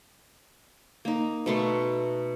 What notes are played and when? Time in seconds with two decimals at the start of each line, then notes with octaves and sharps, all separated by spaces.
1.05 A#3 D#4
1.46 B2 A3 C6